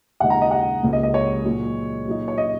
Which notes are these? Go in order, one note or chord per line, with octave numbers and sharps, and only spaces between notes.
D#2 C#3 G#3 D#4 F#5
A#5
D#5
F#5
C#2 C#3 A#3
D#5
D#5
C#5
A#2 F#3 D#4
A#2 F#3 D#4
C#5
D#5